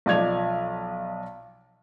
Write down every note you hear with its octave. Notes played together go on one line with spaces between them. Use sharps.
B1 F3 D5 D#5 G#6 F7